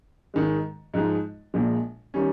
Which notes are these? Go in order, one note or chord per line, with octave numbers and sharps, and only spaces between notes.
G#2 D#3 G#3
G#2 F3 G#3 D#4
A#1 A#2 F3 G#3
D#3 G3 C#4